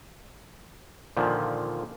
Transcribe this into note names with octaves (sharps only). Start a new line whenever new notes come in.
A#2 D3 D#3 F3